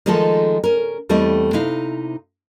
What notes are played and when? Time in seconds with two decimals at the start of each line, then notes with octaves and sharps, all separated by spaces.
0.06 D#3 F3 G#3 A3 D#4 A4
0.64 C#4 A#4
1.09 E2 G3 A3 C4 E4 D#5
1.53 C3 D#4 E4 F5